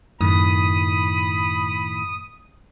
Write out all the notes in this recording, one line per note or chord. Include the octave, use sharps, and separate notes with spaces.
F#2 A2 D#3 B5 D#6